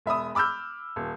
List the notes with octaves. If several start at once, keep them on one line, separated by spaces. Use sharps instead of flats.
E1 E5 B5 D#6
B5 D6 E6 F6 G6
D#1